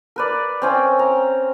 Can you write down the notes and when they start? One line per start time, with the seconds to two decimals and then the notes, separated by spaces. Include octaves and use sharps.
0.16 A#4 B4 D5
0.62 C4 C#4 G5
0.99 A#5